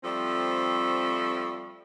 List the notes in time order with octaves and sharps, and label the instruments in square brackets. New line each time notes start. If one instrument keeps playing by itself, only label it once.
[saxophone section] F3 G3 A3 C4 A4